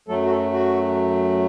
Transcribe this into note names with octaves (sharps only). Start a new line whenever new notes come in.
F#2 F#3 A3 A4
F#4
A4
F#4